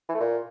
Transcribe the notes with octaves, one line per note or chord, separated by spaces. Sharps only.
E3
A3
A#2